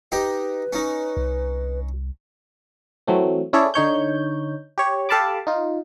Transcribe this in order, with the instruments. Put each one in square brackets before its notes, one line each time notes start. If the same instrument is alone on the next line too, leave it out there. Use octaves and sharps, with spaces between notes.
[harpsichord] D#4 G4 D#5 [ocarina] B4
[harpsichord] C#4 D#4
[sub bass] C2
[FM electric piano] E3 F#3 A3 C4
C#4 E4 G#4 A4 C#5 D5
D3 D#4 C#5 G6
G4 C#5
G4 A4 F5 A5 B5 D6
D#4 F4